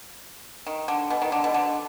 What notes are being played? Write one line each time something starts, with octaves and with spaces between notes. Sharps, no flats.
D#3
D3
B2
D#3
D3
B2
D3